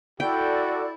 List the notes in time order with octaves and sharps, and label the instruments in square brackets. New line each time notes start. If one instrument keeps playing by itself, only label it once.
[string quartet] E4 [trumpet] F#4 [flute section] A4 D5 [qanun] G5